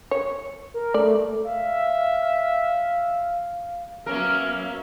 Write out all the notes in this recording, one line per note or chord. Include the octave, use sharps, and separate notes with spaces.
C#5
A#4
A3 D5
E5 F5
F#3 A#3 B3 C#4 A#4 E5 F6